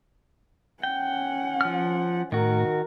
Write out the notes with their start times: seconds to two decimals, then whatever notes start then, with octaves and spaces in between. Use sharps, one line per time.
0.83 C#4 F#5 G5
1.61 F3 F6
2.32 A2 D#3 F#4 A#4